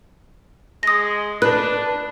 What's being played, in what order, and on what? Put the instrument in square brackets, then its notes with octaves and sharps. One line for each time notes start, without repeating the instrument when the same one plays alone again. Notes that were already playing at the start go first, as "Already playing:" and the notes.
[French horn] G#3 [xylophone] D#6 A#6
[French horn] D4 [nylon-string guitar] B4 [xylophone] F#6